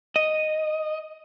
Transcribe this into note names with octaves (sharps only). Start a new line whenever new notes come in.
D#5